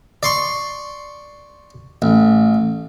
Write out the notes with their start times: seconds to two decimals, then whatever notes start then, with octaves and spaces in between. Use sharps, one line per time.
0.23 D5 C6 C#6
2.02 A1